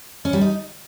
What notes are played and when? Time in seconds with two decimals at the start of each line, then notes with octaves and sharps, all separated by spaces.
0.25 C#4
0.33 G3
0.41 D#4